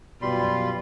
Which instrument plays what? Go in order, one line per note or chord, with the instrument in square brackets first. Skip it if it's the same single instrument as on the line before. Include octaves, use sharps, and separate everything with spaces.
[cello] F#2 F4 [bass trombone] B2 [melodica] G3 B5 C6